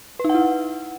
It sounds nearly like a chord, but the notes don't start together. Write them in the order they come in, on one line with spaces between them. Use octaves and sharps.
B4 D#4 F#5 E4